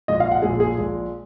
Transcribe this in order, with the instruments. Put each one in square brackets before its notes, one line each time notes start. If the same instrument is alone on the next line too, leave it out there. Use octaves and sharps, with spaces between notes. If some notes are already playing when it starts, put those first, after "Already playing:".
[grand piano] A#1 A#2 G#3 [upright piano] D#5
[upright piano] F5
F#5
[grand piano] A#1 A#2 G#3 [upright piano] G#4
[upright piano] G#4
[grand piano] A#1 A#2 G#3